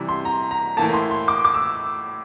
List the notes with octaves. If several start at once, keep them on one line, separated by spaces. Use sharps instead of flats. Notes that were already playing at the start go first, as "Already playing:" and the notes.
Already playing: C3 E3 G3
C6
A#5
A#5
A2 E3 A#3 A5
C6
C6
D6
D6
E6